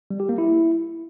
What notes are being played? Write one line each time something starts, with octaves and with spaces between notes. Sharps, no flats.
G3
G4
A#3
E4